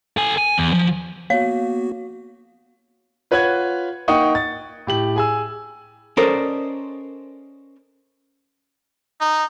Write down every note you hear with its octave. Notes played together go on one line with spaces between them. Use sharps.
A4 G#5
G#5
E2
F3
A#3 B3 F#4 C#5 F5
F4 B4 C#5 F#5 F#6 G#6
A#3 D#4 F#5 G5 C#6 D#6
A6
A2 G4 F#7
G#4 G#5 E6
C#4 A4 A#4 C5 D5 D#5
D#4